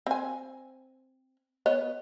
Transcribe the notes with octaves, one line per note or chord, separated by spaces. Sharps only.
C4 G#5
B3 C#5 D#5